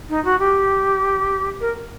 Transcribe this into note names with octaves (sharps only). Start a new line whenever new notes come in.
D#4
F#4
G4
A#4